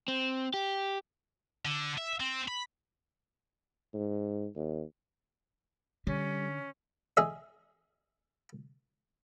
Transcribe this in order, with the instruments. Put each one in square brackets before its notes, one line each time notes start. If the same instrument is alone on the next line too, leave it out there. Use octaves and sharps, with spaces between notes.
[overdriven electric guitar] C4
G4
[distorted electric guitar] D3
E5
C4
B5
[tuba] G#2
D#2
[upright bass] D3 [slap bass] G3 [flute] C#4
[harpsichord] G#4 D#5 E5